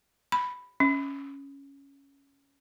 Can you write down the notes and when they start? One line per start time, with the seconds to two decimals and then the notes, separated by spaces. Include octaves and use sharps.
0.32 B5
0.80 C#4